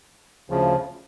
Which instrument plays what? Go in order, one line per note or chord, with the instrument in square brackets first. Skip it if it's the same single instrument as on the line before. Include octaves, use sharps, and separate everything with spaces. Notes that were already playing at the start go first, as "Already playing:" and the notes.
[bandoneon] D2 C#3 F3